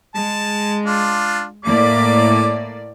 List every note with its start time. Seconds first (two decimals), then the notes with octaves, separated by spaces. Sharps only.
0.15 G#3 A5
0.86 D4 F4
1.65 A2 A#3 D5 D6